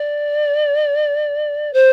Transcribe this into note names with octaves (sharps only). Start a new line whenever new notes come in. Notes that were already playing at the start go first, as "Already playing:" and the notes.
Already playing: D5
C5